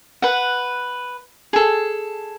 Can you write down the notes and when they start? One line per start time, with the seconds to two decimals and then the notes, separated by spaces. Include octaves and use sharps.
0.22 B4 F#5
1.53 G#4 A4